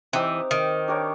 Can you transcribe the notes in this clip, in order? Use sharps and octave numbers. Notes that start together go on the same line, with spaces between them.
E3 C4 D#4 G4
D#3
D4 G4 A#4 C#5